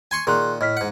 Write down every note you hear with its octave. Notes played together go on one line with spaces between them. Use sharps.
G#5 C6 C#6
A#2 D#3 G#4 C6 F#6
A2 D#5 F6 B6
G#2 F#5